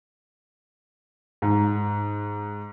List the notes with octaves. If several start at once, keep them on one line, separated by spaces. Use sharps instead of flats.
G#2